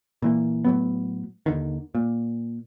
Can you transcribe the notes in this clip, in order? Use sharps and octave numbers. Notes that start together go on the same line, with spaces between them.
A#2 E3 A#3
A2 F#3 B3
D#2 D3 D#3
A#2